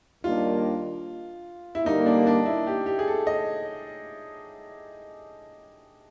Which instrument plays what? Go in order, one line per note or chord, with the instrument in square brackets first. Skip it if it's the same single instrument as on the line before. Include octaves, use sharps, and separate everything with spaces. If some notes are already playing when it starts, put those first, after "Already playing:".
[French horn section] D#2 D#3 G3 A#3 D4 [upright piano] F4
[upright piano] E4
[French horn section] D#2 D3 G3 A#3 [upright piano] D#4
[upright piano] D4
D4
E4
G4
G4
G#4
A4
D#5